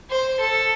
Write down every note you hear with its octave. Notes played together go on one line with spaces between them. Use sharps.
C5
A4